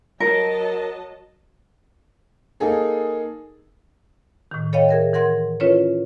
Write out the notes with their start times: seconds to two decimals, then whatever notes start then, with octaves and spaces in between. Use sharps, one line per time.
0.20 F#3 A#4 D#5 A5
2.60 A#3 D#4 G#4 A4
4.51 A2 D#3
4.73 A4 C#5 D#5 F5 G5
4.89 G#4 A#4 E5
5.13 E3 A#4 F#5 C6 G#6
5.60 C#4 E4 F4 A4 B4 C#5